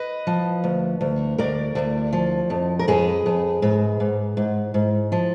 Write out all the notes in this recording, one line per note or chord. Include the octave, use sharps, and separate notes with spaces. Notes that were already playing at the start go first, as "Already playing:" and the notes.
Already playing: B4 D#5
F3
D2
D2
D2 A#4 D5
D2
F3
F2
A#4
F2 G#4 B4
F2
G#2
G#2
G#2
G#2
F3